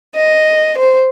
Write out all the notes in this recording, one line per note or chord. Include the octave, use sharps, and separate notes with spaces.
D#5
C5